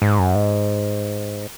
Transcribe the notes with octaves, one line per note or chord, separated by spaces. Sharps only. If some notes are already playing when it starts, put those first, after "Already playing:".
G#2
F#2
G#2